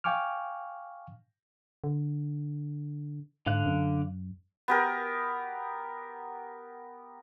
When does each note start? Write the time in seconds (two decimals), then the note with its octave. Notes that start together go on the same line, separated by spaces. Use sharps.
0.04 F5 G5 G#5 C#6 D6 F6
1.84 D3
3.47 G#2 D3 F5 F#6
3.66 F#2
4.68 B3 G4 A#4